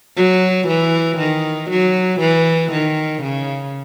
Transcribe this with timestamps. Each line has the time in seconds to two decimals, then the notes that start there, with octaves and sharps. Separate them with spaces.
0.16 F#3
0.68 E3
1.18 D#3
1.70 F#3
2.20 E3
2.72 D#3
3.22 C#3